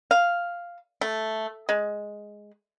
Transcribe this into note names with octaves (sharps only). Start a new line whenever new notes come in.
F5
A3
G#3